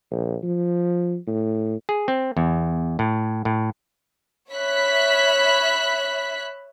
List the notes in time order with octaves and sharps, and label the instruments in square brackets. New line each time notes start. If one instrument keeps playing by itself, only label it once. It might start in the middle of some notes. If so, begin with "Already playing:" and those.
[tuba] A#1
F3
A2
[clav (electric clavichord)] G#4
C4
E2
A2
A2
[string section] C#5 E5 B5 F#6 B6